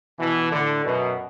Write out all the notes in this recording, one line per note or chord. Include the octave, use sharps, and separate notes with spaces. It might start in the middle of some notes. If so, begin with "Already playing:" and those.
B2 E3
A2 D3
F#2 B2